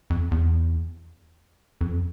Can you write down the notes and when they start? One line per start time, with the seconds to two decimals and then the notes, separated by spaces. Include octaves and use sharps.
0.10 F2
0.31 E2
1.81 F2